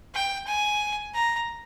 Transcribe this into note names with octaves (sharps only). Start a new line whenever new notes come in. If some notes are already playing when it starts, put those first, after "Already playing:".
G5
G#5
A#5